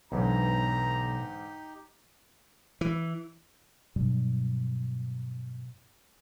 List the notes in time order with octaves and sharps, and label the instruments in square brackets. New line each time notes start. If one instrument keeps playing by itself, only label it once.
[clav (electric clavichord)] B1 [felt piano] G#2 D3 E3 [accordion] D#4 G4 [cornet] A#5
[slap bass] E3
[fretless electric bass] G2 B2 F#3 G3